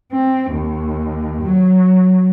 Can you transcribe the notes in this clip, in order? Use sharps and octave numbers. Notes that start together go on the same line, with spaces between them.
C4
D#2
F#3